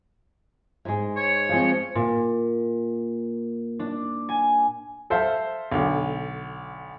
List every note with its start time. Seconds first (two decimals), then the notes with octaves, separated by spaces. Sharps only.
0.85 G#2 G#3
1.16 C#5
1.49 F3 G#3 C4
1.95 A#2
3.79 D4
4.29 G#5
5.10 A4 C5 E5 F5
5.72 B1 D3